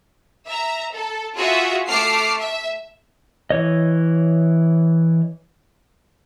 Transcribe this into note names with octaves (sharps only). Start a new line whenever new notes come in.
E5 A#5
A4
F4 F#4 G#4 E5
A3 D6 F6 C7
E5
E3 C#5 D#5